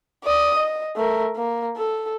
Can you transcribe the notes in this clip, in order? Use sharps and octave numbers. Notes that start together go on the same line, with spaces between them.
D5 D#6
D#5
A3 A#4
A#3
A4